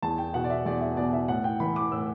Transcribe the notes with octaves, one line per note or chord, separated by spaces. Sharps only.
E2 A5
G5
B2 F#5
D5
E5
E2 D5
E5
B2 D5
E5
A2 F#5
G5
E3 B5
D6
A2 E6